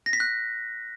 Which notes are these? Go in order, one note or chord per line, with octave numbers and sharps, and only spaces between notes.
A#6
B6
F#6